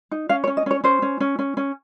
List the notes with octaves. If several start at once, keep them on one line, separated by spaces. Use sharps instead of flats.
D#4
C#4 F5
C#5
C#4
D#5
C#4 C#5
C#4 C5
C#4
C#4
C#4
C#4